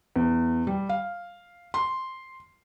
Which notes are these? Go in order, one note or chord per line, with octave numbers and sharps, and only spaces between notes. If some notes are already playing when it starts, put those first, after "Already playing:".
E2
G3
F5
C6